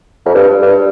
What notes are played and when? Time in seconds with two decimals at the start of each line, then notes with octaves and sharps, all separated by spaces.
0.26 F2
0.35 G2
0.62 G2